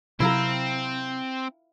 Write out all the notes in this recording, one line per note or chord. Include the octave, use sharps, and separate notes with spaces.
C3 F#3 C4 E4 F4 A#4